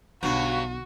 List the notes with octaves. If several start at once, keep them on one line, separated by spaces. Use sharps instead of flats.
B1 G2 D3 F#3 F#4